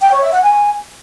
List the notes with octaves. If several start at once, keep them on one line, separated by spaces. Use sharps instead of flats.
G5
C#5
E5
F#5
G#5